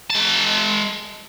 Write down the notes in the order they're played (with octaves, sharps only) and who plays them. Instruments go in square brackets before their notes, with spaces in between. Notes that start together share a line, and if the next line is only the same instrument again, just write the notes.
[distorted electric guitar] G#3 A5